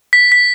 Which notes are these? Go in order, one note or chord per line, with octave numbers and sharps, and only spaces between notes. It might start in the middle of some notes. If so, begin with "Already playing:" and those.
B6
B6